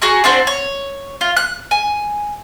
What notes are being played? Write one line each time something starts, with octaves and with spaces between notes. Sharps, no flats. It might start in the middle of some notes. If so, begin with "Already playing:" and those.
F#4 G#4 A#5 C#6
C4 D4 F#4 C5
C#5
F4
F#6
G#5